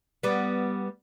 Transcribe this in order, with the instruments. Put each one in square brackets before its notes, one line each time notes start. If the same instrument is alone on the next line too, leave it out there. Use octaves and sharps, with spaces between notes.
[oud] G3 B3